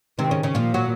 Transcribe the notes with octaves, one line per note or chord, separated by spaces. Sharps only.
C3 D#3 C4
C#3 C#4
C#3 C#4
A#2 F3 F4
F#3 F#4